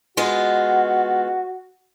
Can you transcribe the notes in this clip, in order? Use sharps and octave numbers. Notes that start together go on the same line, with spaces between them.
G#3 B3 F4 F#4